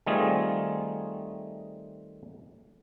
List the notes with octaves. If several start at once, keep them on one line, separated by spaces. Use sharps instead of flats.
D#3 G3 A3 C4 F4 G#4